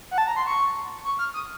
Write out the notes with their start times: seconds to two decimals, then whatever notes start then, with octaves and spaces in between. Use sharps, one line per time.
0.11 F#5
0.18 A5
0.27 A#5
0.36 C6
0.47 C#6
1.05 C#6
1.19 F6
1.34 D#6